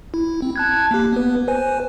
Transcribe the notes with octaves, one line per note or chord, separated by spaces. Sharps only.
E4
C4
A5 F#6 G#6
A#3 G4
B3 B4
B4 C5 G#5